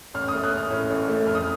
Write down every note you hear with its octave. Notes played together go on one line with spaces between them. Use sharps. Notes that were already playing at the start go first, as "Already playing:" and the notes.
A1 F6
D#6
A3
F#6
C#4 F6
A2
A1
A3
F2 F6
D#6